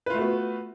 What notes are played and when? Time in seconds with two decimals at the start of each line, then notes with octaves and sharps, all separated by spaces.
0.06 B4
0.10 F4
0.14 A3
0.17 F#4
0.21 B3